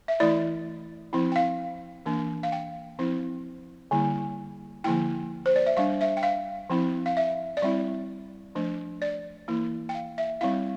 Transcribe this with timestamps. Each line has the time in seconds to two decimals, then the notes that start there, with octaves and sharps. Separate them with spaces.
0.08 E5
0.20 E3 A3 E4 D5
1.13 F3 C4 E4
1.32 G5
1.36 F5
2.06 E3 A#3 D4
2.43 F5
2.52 G5
2.99 F3 C4 E4
3.91 D3 G3 A#3 E4
4.84 D3 F3 A#3 E4 G5
5.46 C5
5.56 D5
5.66 E5
5.77 G3 D4 F5
6.01 E5
6.17 G5
6.23 F5
6.70 F3 C4 E4
7.06 F5
7.17 E5
7.57 D5
7.62 G3 C4 E4 E5
8.55 F3 A3 D4
9.02 D5
9.48 E3 A#3 E4
9.89 G5
9.95 F5
10.18 E5
10.41 G3 C4 E4 F5